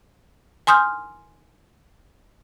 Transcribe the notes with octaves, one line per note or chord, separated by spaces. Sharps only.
G#5 C6 D#6 F6 G6